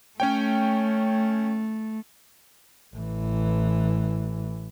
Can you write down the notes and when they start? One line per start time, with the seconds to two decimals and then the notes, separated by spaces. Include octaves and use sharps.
0.20 A3 C#4 C#5 G5
2.95 A1 E3